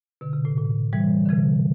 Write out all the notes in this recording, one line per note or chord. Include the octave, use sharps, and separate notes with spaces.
B2 D3
C3
A2
A2
E3 G3
D3
C3 E3